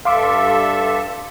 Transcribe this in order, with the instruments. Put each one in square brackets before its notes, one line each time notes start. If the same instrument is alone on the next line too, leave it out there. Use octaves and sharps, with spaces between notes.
[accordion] G2 A4 E5 [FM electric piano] F5 C6 D6